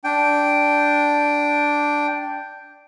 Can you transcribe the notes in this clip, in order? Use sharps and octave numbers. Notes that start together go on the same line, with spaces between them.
D4 G5